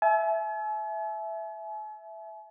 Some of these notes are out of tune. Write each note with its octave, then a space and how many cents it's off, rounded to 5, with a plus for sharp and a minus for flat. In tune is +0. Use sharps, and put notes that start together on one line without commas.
E5 +0 G#5 +45